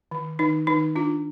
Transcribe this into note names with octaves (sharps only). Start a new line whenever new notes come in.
D#3
D#3 D#4
D#3 D#4
D4 F4